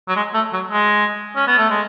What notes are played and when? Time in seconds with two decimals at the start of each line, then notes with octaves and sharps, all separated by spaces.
0.08 F#3
0.16 G#3
0.34 A3
0.53 F#3
0.71 G#3
1.36 C#4
1.47 B3
1.58 A3
1.70 G#3